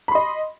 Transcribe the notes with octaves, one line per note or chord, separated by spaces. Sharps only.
D#5 B5 C6